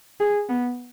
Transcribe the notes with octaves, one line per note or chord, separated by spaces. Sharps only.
G#4
B3